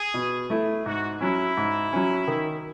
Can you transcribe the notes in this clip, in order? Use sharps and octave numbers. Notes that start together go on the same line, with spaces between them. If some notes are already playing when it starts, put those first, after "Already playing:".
Already playing: G#4
B2
A3 E4
G#2 F#4
F#3 C#4 E4
G#2
F#3 C#4
D#3